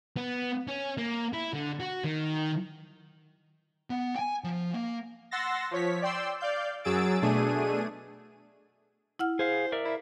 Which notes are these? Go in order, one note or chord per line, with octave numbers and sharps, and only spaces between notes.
B3
C#4
A#3
E4
D3
F#4
D#3
B3
G5 G#5
F3
A#3
F#5 C6 E6 A6 A#6
F3 C#5 B6
D5 G5 C6 E6
D5 F5 G6
F#2 F#3 G#4 E6 A6 D7
B2 A3 D4 G#4 D#7
E4 F#5 F6
G#4 C5 F5
A#4 D5 E5
E4